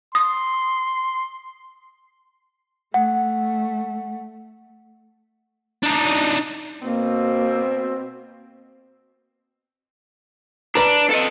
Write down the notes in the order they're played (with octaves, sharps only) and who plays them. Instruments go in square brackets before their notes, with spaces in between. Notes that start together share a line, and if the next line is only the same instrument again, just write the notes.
[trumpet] C6 [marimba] D#6
[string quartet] A3 [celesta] F#5
[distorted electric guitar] D4 D#4
[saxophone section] B2 C4 [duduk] A#3
[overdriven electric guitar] D4 [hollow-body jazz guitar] B4 A#5
[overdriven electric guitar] A4 D#5